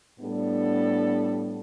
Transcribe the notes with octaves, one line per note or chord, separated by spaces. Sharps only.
A2 G3 B3 D4 A4